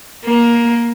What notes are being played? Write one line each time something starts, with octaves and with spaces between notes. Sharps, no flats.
A#3